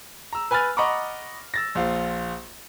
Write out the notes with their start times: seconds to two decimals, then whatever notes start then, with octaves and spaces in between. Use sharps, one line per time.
0.33 A#5 E6
0.51 B4 G#5 B5 F6 A6
0.77 D#5 F#5 A#5 B5 C#6 D6
1.54 E6 A6 A#6
1.75 A#1 F4